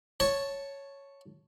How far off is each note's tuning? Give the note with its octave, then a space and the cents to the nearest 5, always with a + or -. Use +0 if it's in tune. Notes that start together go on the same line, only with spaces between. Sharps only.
C#5 +0 A5 +0